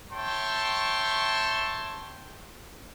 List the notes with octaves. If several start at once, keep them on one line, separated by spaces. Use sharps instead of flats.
C#5 E5 G5 A5 C6 C#6